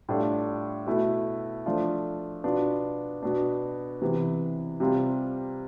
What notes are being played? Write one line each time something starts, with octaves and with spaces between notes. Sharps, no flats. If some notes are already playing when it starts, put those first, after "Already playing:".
A2 G3 D4 F4
B2 A3 E4
F3 A3 D4 F4
B2 B3 D4 F4
B2 B3 D4
C3 E3 B3
C3 G3 C4 F4